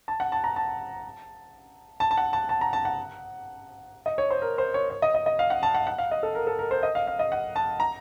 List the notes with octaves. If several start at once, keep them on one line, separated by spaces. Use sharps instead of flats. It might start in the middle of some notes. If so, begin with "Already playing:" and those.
A5
F#5
A5
A#5
A5
A5
A5
F#5
A5
A5
A#5
A5
F#5
D#5
C#5
C5
A#4
C5
C#5
C#5
D#5
D#5
D#5
F5
F#5
A5
F#5
F#5
F5
D#5
A4
A#4
A4
A#4
C5
D#5
F5
F5
D#5
F#5
A5
A#5